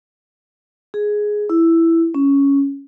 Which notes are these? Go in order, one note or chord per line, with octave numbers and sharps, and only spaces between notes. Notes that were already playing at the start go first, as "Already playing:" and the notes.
G#4
E4
C#4